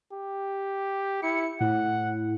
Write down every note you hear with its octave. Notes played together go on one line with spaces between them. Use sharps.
G4
E4 C#7
A2 F#5